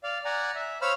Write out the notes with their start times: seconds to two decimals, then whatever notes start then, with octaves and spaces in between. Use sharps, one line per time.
0.03 D5 F5
0.25 D5 F#5 G#5 A#5
0.55 E5
0.82 C5 C#5 F5 B5 E6 F6